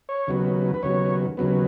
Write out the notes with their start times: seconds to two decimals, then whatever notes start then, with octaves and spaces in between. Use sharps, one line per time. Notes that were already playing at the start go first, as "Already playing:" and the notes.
0.09 C#5
0.27 D#2 C#3 F#3 B3
0.74 B4
0.83 D#2 C#3 F#3 B3 C#5
1.37 D#2 C#3 F#3 B3